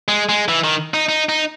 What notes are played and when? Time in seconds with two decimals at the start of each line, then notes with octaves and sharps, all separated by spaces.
0.08 G#3
0.29 G#3
0.49 E3
0.64 D#3
0.94 D#4
1.09 D#4
1.29 D#4